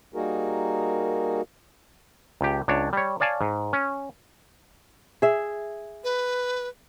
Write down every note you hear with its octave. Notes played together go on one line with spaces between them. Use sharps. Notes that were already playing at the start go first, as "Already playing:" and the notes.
G3 A#3 D#4 F#4 G#4 A#4
C#2 G4
C#2 D4 C#5
G3 C#5
C#5 D5 F5 G#5 A5
G#2
C#4
G#4 E5
B4